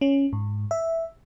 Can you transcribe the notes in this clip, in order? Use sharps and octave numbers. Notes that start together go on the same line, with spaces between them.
C#4
G#2
E5